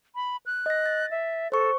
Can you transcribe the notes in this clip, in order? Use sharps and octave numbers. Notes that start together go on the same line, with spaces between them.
B5
F#6
D#5 A#6
A6
E5
A4 C5 C#6